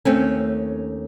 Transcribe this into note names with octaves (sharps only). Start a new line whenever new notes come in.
D#2 A3 C4 C#4